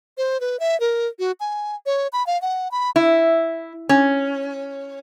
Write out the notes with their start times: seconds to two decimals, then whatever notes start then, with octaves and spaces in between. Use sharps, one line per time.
0.18 C5
0.40 B4
0.60 E5
0.80 A#4
1.19 F#4
1.40 G#5
1.86 C#5
2.13 B5
2.27 F5
2.42 F#5
2.71 B5
2.96 E4
3.89 C#4